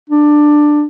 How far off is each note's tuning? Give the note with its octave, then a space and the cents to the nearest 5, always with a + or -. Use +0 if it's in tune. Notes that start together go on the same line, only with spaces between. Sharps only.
D4 +15